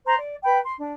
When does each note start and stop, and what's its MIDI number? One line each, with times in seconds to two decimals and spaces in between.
0.05 0.14 72
0.05 0.14 82
0.05 0.14 84
0.17 0.35 74
0.44 0.57 71
0.44 0.57 79
0.44 0.57 83
0.63 0.72 84
0.77 0.91 62